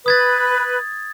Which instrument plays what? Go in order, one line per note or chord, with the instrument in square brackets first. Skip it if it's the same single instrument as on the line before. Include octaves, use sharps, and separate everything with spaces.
[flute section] B4 [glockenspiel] D#6 G#6 A6